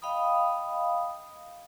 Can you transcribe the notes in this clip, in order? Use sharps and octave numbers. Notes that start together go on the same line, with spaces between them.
D#5 F5 G5 B5 D#6